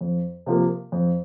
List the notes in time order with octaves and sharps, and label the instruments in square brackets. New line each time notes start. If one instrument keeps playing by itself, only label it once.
[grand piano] F2
C3 F3 A#3
F2